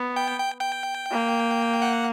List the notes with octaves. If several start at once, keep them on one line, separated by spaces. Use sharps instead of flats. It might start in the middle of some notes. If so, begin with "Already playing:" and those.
Already playing: B3
G5
G5
G5
A#3
F#5